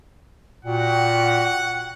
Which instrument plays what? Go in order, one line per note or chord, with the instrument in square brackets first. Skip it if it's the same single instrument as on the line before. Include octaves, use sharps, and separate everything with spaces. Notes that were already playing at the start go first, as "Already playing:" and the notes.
[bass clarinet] A#2 [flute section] F#4 G5 [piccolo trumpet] F#5